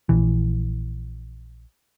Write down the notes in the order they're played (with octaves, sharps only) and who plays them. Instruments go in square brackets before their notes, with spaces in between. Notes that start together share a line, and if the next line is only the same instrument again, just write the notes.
[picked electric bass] A#1 E3